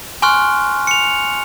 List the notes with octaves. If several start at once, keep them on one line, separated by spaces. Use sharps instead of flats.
G#5 C6 C#6 F6 F#6
C#7 F7